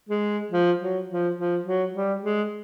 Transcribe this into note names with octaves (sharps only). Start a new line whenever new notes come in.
G#3
F3
F#3
F3
F3
F#3
G3
G#3